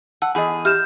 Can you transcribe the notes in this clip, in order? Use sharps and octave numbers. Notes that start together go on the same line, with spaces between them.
F#5 A5 E6
E2 G#4 D#5 F#5
G4 E5 F6 G6 E7